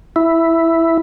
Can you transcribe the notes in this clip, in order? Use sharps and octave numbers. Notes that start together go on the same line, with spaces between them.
E4